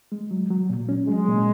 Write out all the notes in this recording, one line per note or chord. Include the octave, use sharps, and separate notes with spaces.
G#3
F#3
F#3
A#2
C#4
F#3 G#3
A#2